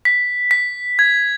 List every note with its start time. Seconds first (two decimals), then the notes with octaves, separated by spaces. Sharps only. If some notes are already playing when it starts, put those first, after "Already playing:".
0.05 B6
0.51 B6
0.99 G#6